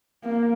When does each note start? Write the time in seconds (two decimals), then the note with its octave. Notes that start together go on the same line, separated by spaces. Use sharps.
0.24 A#3